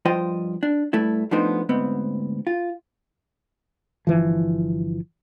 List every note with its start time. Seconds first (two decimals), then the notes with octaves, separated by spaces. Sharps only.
0.05 G2 F3 F4 C5 D#5 G5
0.63 D4
0.93 G2 A3 E4
1.31 F3 A3 B3 D4 D#4 C5
1.69 D2 G#2 B3 C4
2.47 F4
4.07 G1 E3 F3